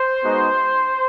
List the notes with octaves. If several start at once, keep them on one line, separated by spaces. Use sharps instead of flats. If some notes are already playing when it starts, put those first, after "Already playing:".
Already playing: C5
G#3 B3 D#4 F#4